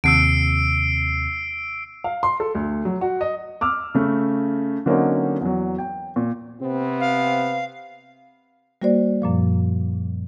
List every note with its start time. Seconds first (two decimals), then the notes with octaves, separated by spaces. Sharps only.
0.04 D#2 C3 E6 C7 D7
2.04 F5
2.23 C6
2.40 A4
2.55 D2
2.85 F#3
3.01 F#4
3.21 D#5
3.61 D6 E6 F6
3.95 C#3 A3
4.86 D3 F#3 A#3 C4 C#4 D#4
5.41 E2 F#3
5.78 G5
6.16 A#2
6.61 C3 B3 C4
7.00 F5
8.82 G3 A#3 F#4 C5 D5
9.22 F#2 A#2 F3